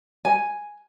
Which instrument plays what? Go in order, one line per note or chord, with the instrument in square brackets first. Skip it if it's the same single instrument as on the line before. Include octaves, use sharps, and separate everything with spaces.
[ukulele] G#5